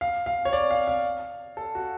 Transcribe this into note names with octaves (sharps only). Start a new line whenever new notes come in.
F5
F5
C#5
D5
F5
F5
A4
F#4